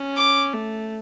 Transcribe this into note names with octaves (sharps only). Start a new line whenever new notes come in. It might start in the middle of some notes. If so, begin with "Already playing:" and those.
Already playing: C#4
D6
A3